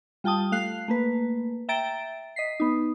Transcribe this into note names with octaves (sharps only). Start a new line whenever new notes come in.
G3 F4 G5 A5 D#6
A3 F5 F#6 C7
A3 A#3 B4
E5 G5 A#5 A6 D7
D#5 B6 C7
B3 D#4